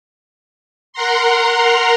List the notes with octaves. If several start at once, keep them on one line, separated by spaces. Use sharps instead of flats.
A#4 F#5 A#5 C6